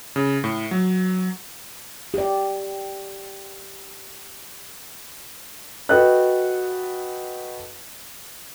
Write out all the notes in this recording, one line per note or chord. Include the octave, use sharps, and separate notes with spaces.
C#3
A2
F#3
G4 D5
F#4 A4 B4 D#5 G5 F#6